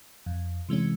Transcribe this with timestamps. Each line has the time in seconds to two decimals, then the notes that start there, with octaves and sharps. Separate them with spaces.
0.26 F2
0.69 C3 E3 G#3 C#4